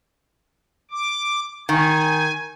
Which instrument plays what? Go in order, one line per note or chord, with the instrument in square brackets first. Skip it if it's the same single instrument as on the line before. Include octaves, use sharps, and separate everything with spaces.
[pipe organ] D6
[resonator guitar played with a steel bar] D#3 [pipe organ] G#5